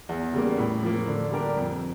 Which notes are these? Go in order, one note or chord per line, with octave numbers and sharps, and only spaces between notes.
E2
C#3 G3 A#3
A2
F3 A#3
D3
G3 D4 G4 A#4
F2